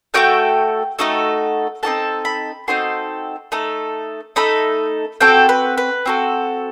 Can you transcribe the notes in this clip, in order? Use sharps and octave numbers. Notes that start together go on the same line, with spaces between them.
A3 D#4 F#4 A4 G5
A3 D#4 F#4 A4
C4 D#4 F#4 A4 A5
B5
C4 D#4 F#4 A4 C6
A3 D#4 A4
A3 D#4 A4 B5
C4 F#4 A4 G5
B4
B4
C4 F#4 A4